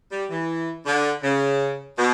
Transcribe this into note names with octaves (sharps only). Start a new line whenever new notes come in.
G3
E3
D3
C#3
B2